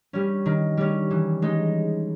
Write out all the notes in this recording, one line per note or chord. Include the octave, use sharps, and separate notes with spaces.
G3 C#4
D#3
G3 C#4
E3
G#3 D#4